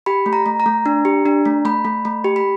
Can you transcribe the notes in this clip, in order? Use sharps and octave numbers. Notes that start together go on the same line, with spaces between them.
G4 B5
A3
A#5
A3
A#5
A3
D4
G4
D4
A3
A3 B5
A3
A3
G4
B5